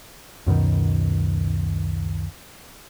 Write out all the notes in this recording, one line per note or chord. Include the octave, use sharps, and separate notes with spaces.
C#2 F#2 B2 D#3